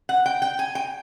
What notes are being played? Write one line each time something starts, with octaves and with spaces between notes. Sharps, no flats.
F#5
G5
G5
G#5
G5